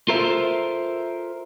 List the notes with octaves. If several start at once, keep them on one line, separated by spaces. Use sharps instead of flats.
F4 A4 A#4 C5 E5